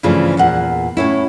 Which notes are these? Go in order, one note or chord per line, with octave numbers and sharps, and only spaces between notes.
G2 C#3 E3 F3 A3
E2 A#2 F#5
A2 C#4 E4